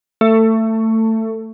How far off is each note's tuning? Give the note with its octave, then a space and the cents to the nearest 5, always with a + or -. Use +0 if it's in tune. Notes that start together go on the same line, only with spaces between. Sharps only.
A3 +20